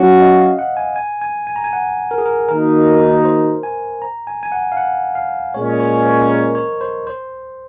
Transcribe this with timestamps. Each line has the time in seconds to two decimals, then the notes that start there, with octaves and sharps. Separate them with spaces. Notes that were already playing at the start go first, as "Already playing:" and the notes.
Already playing: F#3 C#4 F#4 F5
0.20 D#5
0.39 F5
0.59 F#5
0.77 G#5
0.96 G#5
1.22 G#5
1.47 G#5
1.56 A#5
1.64 G#5
1.73 F#5
2.11 A#4
2.18 G#4
2.26 A#4
2.49 D#3 A#3 D#4 F#4 A#4
3.25 C5
3.63 G#5
4.02 A#5
4.27 G#5
4.43 G#5
4.52 F#5
4.72 F5
4.77 F#5
5.15 F5
5.53 A#2 G#3 C#4 C#5
5.69 D#5
5.80 C#5
6.05 C5
6.29 A#4
6.55 C#5
6.81 C5
7.07 C5